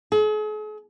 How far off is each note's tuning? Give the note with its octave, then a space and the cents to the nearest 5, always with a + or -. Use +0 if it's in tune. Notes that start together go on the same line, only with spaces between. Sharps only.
G#4 +45